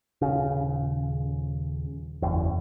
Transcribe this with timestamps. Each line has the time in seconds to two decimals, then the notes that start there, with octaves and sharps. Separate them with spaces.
0.22 D#1 A#1 C#3
2.22 F#1 E2